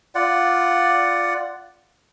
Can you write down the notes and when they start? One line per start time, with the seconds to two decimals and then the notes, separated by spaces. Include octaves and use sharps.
0.15 F4 D5 F#5